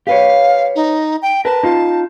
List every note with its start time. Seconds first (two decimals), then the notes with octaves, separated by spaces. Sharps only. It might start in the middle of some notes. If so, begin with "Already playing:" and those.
0.07 G4 B4 C#5 F5
0.76 D#4
1.22 G5
1.45 A#4 B4 A5
1.63 D#4 F4